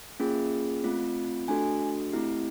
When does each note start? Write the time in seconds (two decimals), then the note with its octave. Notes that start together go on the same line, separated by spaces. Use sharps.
0.20 A#3 C#4 F4 G#4
0.84 A3 C4 F4
1.48 A3 D4 F#4 A4 G#5
2.12 A3 C4 E4 G4